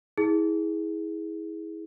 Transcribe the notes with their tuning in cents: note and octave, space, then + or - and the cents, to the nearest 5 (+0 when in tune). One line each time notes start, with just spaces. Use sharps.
E4 -30 G#4 +0